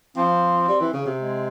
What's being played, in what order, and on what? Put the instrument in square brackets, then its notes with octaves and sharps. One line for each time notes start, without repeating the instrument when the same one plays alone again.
[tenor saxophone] F3 [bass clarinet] C4
[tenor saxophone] G3
E3
C#3
C3
[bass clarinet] G#3